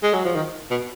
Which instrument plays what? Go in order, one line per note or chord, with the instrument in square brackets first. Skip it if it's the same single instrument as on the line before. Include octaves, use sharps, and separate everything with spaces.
[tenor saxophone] G#3
F#3
F3
D#3
B2